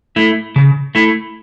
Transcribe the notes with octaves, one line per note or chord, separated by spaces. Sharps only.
A3 E4
C#3
A3 E4